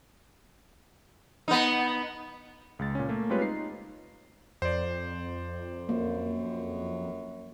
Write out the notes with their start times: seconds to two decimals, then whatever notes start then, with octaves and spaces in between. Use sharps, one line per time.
1.48 B3 D#4
2.79 C#2 G#3 A6
2.95 A#2 C#4
3.09 A3 A#3
3.30 G3 G#3 C4 F4 B4 C#5
3.41 D#4 C7
4.62 F2 C5 D5
5.89 F#2 A#3